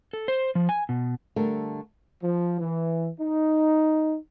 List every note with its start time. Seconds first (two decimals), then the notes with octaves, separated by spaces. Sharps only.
0.13 A4
0.28 C5
0.55 F3
0.69 G#5
0.89 B2
1.36 D3 G3 A3 A#4
2.23 F3
2.60 E3
3.20 D#4